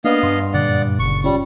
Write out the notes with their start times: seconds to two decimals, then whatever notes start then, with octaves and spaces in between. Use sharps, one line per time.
0.05 A#3 B3 D4 D#5 F5
0.23 G2 C6
0.54 F#2 A#2 D3 D5 F#5
0.99 F#1 C#6
1.24 G3 C#4 F4 G4